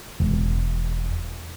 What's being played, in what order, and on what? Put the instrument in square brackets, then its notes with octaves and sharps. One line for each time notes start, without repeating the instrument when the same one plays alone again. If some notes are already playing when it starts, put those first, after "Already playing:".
[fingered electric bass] E1